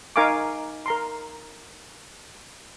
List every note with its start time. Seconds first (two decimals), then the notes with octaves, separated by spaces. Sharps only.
0.16 D#4 A#4 F5 G#5 C#6 D6
0.86 A#4 A#5 C6